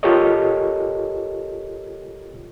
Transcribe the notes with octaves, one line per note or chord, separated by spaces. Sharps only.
F4 G4 A4 A#4 C#5 D#5